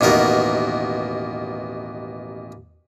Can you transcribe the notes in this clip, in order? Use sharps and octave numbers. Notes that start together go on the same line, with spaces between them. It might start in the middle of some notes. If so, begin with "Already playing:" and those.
A1 D#2 B2 A#4 F#5